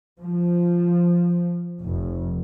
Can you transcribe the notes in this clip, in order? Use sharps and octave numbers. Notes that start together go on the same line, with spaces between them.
F3
F1